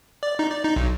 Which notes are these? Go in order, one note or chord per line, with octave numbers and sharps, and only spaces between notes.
D5
D#4
D5
D#4
B1